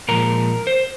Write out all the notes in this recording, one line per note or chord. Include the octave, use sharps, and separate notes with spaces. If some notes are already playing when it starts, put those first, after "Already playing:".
A#2 F3 G#3 A#4
C5